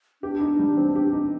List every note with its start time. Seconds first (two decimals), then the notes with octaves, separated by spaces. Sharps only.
0.22 D4 G4
0.41 D#4
0.59 G3
0.77 C4
0.95 G4
1.13 D#4